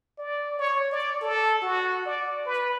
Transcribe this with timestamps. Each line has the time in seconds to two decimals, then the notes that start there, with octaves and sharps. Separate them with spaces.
0.19 D5
0.59 C#5
0.92 D5
1.22 A4
1.62 F#4
2.06 D5
2.46 B4